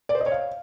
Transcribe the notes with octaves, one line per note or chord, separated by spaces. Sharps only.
D5
C5
D#5
C#5
F5